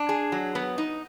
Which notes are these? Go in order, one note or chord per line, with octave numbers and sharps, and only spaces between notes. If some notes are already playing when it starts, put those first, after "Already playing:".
Already playing: D4
G#4
F#3
B3
D#4